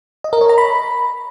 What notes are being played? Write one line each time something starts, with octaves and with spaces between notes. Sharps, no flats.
D#5
A#4
C#5
A#5
B5